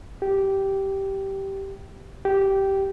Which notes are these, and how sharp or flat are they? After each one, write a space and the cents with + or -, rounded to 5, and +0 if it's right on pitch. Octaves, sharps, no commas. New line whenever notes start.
G4 -10
G4 -10